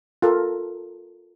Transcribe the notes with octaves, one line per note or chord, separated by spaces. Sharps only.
F4 A4 A#4